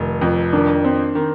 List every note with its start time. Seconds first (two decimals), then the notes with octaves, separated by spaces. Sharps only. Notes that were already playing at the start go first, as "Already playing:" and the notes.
Already playing: F1 D#3
0.21 F2
0.53 D#3 D4
0.84 C4
1.15 D#3